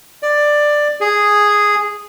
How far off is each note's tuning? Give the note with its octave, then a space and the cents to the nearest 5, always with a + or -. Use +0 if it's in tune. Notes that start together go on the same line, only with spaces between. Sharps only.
D5 +10
G#4 -5